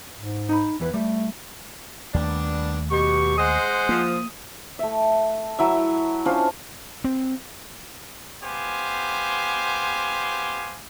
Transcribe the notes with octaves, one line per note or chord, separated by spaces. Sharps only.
G#2
D#4 B5
E2 E3 B4
G3 A3
D#2 D#3 G3 A3 B3 D4
B2 G4 C#6
G#3 G#4 C5 D#5 F#5 D#6
F3 A#3
A3 E5
F#3 E4 E5
C#4 D4 F4 C5
C4
B3 G4 C5 F5 G#5